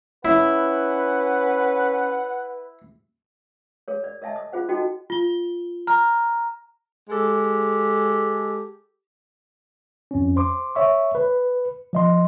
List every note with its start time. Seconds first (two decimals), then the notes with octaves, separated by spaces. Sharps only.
0.25 C#4 E4 B4 F#5
3.88 G#4 A#4 C#5
4.04 D5
4.22 A#4 D#5 E5 G#5 A5
4.36 D#6
4.53 F4 G#4 C5 F#5
4.69 D#4 F#4 A4 D#5 G5
5.10 F4 G7
5.87 A#5 F6
7.09 G#3 G4 A4
10.11 F2 C#4
10.36 C5 C6 D6
10.75 C#5 E5 C#6
11.15 B4
11.93 F3 D#5 C6